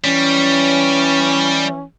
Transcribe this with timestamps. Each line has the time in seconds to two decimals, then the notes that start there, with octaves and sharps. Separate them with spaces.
0.04 E3 G3 C#4